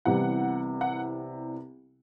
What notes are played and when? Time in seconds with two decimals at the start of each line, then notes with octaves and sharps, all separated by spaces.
0.05 C2 C3 E3 G3 B3 F#5
0.81 F#5